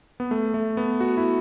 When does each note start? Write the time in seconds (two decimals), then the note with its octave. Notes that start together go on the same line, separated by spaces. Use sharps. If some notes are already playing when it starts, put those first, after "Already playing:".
0.20 B3
0.31 A3
0.54 A3
0.77 B3
1.00 F#4
1.17 E4